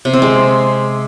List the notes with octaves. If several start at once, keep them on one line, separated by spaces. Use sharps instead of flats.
C3
C4
G#3